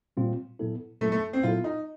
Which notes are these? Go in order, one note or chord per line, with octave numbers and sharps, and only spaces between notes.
A#2 G3 C4 F4
A#2 F#3 B3 E4 A4
A#2 F#3 A3 B3 E4 A4
A3
C4
A#2 F#3 B3 E4 F4 A4
D#4